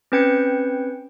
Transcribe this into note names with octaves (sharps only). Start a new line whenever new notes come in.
C4 C#4 B4 G5 G#6 C#7